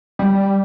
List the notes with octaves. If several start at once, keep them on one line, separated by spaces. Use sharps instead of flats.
G3